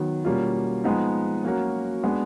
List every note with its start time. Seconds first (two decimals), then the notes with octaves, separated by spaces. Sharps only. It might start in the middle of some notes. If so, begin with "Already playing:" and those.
Already playing: D#3 F#3 B3
0.25 B2 G3 A#3 C#4 F4
0.84 F3 G#3 B3 D#4
1.43 F#3 A#3 C#4 F#4 A#4
2.03 G#3 B3 D4